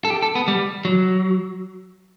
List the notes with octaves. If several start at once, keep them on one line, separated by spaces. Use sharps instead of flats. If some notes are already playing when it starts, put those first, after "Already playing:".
A4
G4
A4
B3
G3
F#3